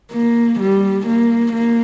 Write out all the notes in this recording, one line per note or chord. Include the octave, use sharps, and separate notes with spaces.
A#3
G3
A#3
A#3